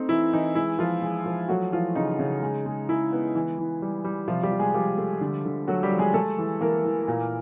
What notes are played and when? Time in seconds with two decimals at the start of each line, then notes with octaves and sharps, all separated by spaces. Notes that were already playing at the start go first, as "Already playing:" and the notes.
Already playing: A3 C4 D#4
0.09 E3 E4
0.33 E3 D#4
0.55 G#3 E4
0.79 F3 F4
1.02 G#3
1.26 F3
1.49 F#3 A3 F#4
1.72 E3 F3 F4
1.95 C#3 D#4
2.19 C#3
2.43 G#3
2.66 G#3
2.89 G#3 E4
3.12 B3
3.35 E3
3.58 E3
3.82 G3
4.05 G3
4.28 C3 F3 F4
4.43 G3 G4
4.52 F3
4.59 G#3 G#4
4.74 F3 G3 G4
4.98 A3
5.21 D3
5.45 D3
5.68 F#3 A3 F#4
5.83 G3 G4
5.91 F3
5.99 G#3 G#4
6.14 G#3 A3 A4
6.38 E3
6.61 E3 A#3 A#4
6.85 E3
7.08 A#2